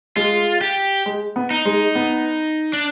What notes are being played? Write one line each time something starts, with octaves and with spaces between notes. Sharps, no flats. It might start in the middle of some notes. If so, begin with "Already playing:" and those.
G#3 F4
G4
G#3
B3
D#4
G#3
B3
D4